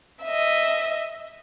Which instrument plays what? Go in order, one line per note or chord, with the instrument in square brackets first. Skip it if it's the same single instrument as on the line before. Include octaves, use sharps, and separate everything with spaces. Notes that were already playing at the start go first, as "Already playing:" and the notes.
[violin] D#5 E5